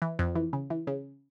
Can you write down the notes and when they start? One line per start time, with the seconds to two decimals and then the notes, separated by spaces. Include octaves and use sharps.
0.02 E3
0.19 F2
0.35 E3
0.53 C#3
0.70 E3
0.87 C#3